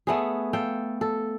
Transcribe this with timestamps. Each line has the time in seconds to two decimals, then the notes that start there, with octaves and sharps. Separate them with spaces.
0.07 A3 B3 G#4
0.53 A4 F5 G5
1.01 A4